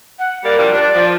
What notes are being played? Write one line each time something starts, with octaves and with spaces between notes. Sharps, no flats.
F#5
G3 A#3 A#4 D5
F3 G3 D4
D4 D5
F3